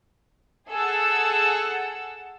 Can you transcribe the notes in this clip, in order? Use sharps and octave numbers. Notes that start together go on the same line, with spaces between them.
G#4 A4 F#5 E6